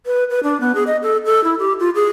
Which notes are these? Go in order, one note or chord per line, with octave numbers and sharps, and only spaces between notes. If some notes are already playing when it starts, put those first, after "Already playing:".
B4
B4
D4
B3
G#4
D#5
A4
A4
E4
G4
F4
G#4